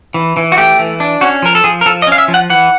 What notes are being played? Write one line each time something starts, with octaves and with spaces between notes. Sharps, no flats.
E3
E3
F#4
A3 G4
E3
D4
C#4 F#4
F3 A#4
A4
F3 G#4
A#4
F3 A4
D#5
C#4
F5
E5
F3
F#5
E3 F#5